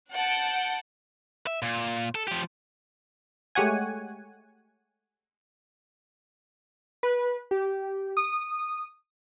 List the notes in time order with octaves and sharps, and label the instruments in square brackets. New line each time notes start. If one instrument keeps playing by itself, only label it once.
[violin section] F#5 A5 G6 D7
[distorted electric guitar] E5
A#2
A4
F3 G4
[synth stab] G#3 A3 G4 C#5 F#5 G#5
[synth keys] B4
G4
D#6